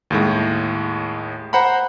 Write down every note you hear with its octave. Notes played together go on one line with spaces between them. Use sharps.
D#2 A2 G#3
C5 F#5 A#5 B5